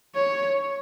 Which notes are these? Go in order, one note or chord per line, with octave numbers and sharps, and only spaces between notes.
C#5